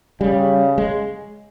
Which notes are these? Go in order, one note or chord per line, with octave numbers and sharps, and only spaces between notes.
C#3 G3
G#3